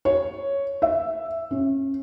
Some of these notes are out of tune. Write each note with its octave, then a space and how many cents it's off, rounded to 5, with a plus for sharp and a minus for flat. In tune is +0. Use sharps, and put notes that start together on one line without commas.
C#5 +0
E5 +5
C#4 -25